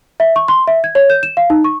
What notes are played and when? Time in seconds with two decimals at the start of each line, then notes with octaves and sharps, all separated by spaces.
0.20 E5
0.36 C#6
0.48 C6
0.68 E5
0.84 G#6
0.95 C#5
1.10 G6
1.23 E7
1.37 F5
1.50 D#4
1.64 C#6